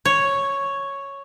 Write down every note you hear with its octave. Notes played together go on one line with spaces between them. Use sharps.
C#5